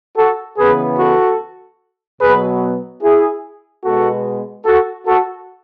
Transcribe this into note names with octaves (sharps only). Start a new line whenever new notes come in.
F#4 A4
C#3 E3 B3 G#4 B4
F#4 A4
B2 F#3 B3 G#4 B4
E4 G#4
B2 G#3 B3 F#4 A4
F#4 A4
F#4 A4